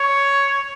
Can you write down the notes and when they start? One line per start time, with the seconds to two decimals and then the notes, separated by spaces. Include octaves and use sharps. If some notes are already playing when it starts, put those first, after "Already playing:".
Already playing: C#5